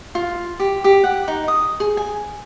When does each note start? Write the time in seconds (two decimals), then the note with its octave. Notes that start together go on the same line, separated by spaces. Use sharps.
0.15 F4
0.60 G4
0.84 G4
1.04 F#5
1.28 D#4
1.48 D#6
1.80 G#4
1.97 G#5